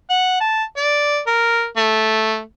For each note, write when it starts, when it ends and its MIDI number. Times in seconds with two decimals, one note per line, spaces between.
0.10 0.37 78
0.41 0.63 81
0.77 1.19 74
1.27 1.67 70
1.77 2.40 57